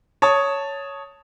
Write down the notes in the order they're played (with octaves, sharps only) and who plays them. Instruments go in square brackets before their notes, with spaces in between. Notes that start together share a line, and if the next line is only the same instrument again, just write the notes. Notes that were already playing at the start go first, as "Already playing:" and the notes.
[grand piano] C#5 A5 D#6